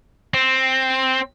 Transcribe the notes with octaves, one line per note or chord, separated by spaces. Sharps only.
C4